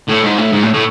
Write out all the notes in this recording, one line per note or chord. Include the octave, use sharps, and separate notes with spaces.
A2
G#2
A2
G#2
A2
A2